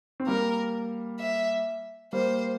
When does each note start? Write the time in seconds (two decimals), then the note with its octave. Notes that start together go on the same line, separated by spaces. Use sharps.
0.20 C4
0.27 G3 A#3 A#4
1.19 E5
2.13 G3 A#3 C5